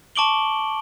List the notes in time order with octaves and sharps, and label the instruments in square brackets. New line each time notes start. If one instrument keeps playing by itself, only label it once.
[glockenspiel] A5 C#6 D6 D7 F#7 G7